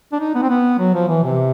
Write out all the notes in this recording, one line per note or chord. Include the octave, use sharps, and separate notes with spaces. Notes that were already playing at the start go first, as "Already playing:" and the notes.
D4
D#4
B3
C4
B3
F#3
F3
E3
C3